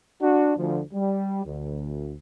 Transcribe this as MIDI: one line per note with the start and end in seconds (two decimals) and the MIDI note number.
0.21 0.53 62
0.21 0.53 66
0.57 0.80 38
0.57 0.80 53
0.93 1.41 55
1.45 2.14 38